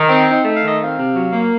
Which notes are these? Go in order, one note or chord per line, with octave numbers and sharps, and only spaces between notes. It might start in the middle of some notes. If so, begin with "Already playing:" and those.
Already playing: D#3
C4
D#4
A3
F5
D#3
D#5
C4 F5
C3
F#3
A#3